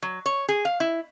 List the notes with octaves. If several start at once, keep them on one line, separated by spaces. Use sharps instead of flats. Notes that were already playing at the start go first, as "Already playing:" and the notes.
F#3
C#5
G#4
F5
E4